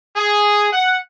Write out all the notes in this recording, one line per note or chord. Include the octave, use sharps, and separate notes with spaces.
G#4
F#5